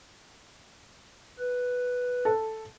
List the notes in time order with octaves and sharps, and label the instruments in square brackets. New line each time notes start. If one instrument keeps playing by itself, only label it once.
[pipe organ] B4
[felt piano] A4